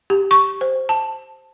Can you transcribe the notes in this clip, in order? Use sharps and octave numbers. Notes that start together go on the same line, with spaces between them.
G4
C#6
C5
A5